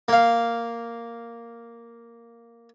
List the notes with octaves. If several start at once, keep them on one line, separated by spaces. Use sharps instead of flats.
A#3 F5